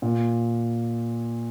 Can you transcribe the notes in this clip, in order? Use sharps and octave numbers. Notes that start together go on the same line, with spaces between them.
A#2